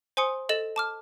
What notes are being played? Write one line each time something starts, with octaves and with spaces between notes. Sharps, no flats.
C5 G#5 C6 D#6 C#7
A4 D#5 A6 E7
A5 D6 F6